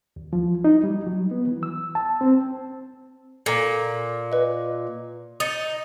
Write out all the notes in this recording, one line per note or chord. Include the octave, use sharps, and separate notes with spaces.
D#2
F3
D#4
G3
F#3
B3
E3
E6
A5
C4
A#2 A4 A#5
B4 D#5
D#4 D#6 A6 C#7